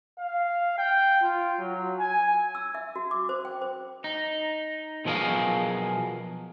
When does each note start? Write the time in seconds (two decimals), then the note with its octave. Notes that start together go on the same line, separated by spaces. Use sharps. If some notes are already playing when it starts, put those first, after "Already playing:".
0.19 F5
0.78 G5
1.22 F4
1.59 F#3
1.99 G#5
2.55 E6
2.75 E5
2.96 F#4
3.11 D6
3.29 C5
3.45 G5
3.62 C5
4.04 D#4
5.05 B2 F3 F#3 G#4 A#4 F5